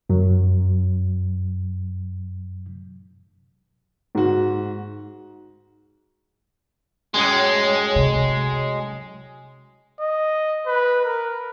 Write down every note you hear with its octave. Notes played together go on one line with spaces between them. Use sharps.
F#2 F#3
G#2 F#4
F#2 A2 G#3
C3 F#3
D#5
B4
A#4